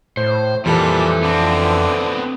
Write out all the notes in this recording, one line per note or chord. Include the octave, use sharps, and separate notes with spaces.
A2 C5
F2 A#2 E3 G3 A4
D3 B3 C4